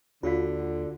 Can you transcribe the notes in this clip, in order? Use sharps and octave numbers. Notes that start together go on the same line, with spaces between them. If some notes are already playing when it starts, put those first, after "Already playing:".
D#2 D3 F4 F#4 F5